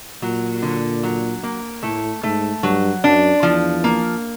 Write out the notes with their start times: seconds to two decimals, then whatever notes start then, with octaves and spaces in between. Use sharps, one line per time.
0.22 A#2 F#3
0.62 D3
1.03 F#3
1.43 A#3
1.83 A2 A3
2.23 G#2 A3
2.63 G2 F#3
3.04 F#2 D4
3.43 E2 F3
3.84 A#3